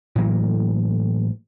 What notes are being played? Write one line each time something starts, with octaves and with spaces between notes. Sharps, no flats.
A2 E3 F#3 A#3